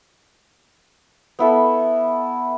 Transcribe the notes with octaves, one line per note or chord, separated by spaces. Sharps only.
B3 E4 A4